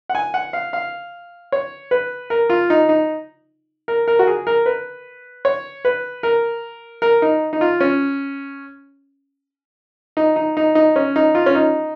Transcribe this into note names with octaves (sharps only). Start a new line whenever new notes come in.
F#5
G#5
F#5
F5
F5
C#5
B4
A#4
F4
D#4
D#4
A#4
A#4
F#4
G#4
A#4
B4
C#5
B4
A#4
A#4
D#4
D#4
F4
C#4
D#4
D#4
D#4
D#4
C#4
D#4
F4
C#4
D#4